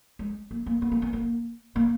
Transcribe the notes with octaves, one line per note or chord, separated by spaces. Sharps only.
G#3
A#3
A#3
B3
A#3
B3
A#3
A#3